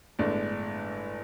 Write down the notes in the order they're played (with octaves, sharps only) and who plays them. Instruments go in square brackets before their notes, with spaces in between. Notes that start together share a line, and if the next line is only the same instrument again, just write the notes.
[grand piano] G1 A2 G#3 D4